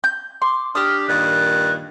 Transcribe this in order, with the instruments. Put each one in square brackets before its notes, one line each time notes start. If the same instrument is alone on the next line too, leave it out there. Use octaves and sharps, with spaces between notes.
[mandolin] G6
[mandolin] C6 [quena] D6
[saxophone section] D4 G4 [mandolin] D#6 [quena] F6
[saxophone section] G2 A#2 D#3 [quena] F#6